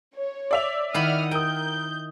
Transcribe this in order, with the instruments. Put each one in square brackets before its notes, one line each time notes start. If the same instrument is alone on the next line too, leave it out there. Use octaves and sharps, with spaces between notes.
[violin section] C#5
[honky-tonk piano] D5 E5 F7
[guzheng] D#3 E4 B5 [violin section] F#5 D#6 F6
[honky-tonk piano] A#4 D#6 [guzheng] G5 [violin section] G6